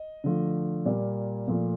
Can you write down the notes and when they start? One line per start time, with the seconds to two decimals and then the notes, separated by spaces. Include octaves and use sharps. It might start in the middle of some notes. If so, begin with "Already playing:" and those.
Already playing: D#5
0.24 D3 F3 A3
0.85 A#2 G3 A#3 D5
1.48 A#2 F3 A3